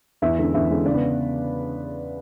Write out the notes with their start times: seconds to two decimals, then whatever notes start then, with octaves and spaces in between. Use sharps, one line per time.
0.22 E2 E4 E5
0.38 D3 G#3 C#4
0.54 E2 E4 E5
0.70 D3 G#3 C#4
0.85 C#3 D4 D5
0.94 B3 B4